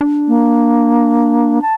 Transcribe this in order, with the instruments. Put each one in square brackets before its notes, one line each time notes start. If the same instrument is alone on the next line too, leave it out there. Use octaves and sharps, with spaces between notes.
[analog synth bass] D4
[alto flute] A#3
A5